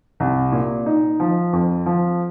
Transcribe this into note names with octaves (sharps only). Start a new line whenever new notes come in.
C2
A#2
D#4
F3
F2
F3